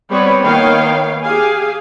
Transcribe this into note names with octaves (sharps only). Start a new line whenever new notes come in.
G3 B3 C4 C#5 D5 B5
D#3 A#3 B3 C#5 F5 G5
G4 G#4 F5 G#5